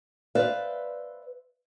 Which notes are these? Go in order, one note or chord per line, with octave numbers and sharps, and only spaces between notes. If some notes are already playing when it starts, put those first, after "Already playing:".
B4 C5 D5 E5 F5